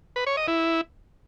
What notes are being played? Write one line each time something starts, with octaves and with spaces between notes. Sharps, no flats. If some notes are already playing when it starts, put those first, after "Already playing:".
B4
C#5
D#5
E4